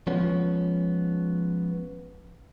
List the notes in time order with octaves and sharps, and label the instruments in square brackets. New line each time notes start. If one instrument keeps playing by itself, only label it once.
[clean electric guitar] F3 G#3 B3 C#4